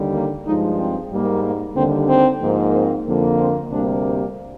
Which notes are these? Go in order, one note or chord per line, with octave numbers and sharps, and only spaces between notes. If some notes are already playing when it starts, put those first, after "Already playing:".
Already playing: D#2 D3 G3
A#3
G2 F3 G#3 D#4
C4
G#2 G3 A#3
A#3
D#2 D3 G3 A#3 C4
C4
G#2 F3 A#3
C4
F2 D3 F3 A#3
C4
D2 C3 G3 A#3 D4